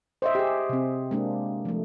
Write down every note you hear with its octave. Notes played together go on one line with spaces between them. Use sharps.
C5 D#5 E5
G4 G#4
C3 C4
G#3 A#3 D4
F3 A3